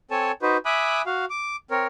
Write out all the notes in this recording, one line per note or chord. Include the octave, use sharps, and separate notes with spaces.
C4 A4 C#5 G#5 A5
D#4 F#4 B4 C5
E5 G#5 B5 D6 D#6 F#6
F#4 F5
D6
C4 A#4 C#5